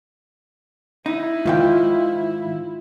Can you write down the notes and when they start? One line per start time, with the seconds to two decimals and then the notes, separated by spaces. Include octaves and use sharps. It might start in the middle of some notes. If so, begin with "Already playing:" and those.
1.06 D#4 E4
1.46 G#2 D#3 F4 G5